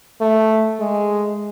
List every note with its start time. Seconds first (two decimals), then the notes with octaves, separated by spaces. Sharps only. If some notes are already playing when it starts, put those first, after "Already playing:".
0.21 A3
0.79 G#3